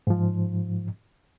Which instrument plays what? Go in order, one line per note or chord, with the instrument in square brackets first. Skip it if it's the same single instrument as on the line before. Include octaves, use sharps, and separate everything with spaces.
[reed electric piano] G#2 F3